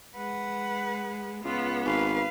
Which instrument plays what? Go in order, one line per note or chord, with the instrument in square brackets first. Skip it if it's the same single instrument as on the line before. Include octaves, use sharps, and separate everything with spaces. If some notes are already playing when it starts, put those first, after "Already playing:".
[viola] G#3 [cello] B4 F#5
[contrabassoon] C#2 [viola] B3 [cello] F4
[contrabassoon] G#1 [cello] B4 F5